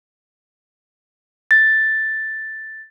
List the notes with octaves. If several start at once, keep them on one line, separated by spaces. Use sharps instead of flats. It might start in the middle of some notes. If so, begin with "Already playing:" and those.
A6